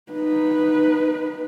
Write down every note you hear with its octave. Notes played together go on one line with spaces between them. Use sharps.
D#4 B4